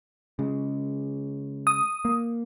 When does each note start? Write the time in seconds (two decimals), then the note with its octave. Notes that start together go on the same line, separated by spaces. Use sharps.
0.39 C#3 G#3
1.67 D#6
2.05 A#3